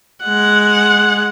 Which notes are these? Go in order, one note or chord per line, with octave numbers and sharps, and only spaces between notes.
G#3 F#5